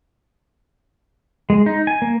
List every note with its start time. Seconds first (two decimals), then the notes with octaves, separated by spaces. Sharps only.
1.50 G#3
1.66 D#4
1.87 G#5
2.02 A#3